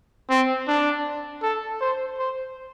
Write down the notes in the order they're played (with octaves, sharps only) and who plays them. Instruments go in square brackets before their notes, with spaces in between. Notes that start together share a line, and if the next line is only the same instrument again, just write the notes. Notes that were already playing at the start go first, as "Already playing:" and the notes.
[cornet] C4
D4
A4
C5
C5